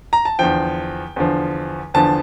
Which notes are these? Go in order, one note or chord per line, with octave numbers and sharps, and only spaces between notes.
A#5
A5
E2 D3 F3 G5
E2 D3 F3
E2 D3 F3 A5